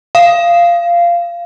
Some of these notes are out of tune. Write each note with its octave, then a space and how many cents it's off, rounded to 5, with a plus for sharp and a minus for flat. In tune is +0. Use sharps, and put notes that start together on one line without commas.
F5 -15